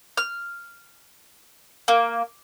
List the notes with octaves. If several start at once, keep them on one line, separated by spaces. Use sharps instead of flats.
F6
A#3